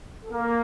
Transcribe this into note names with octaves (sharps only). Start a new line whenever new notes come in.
A4
A#3 A#4